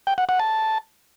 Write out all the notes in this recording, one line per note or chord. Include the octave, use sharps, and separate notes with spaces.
G5
F#5
F#5
A5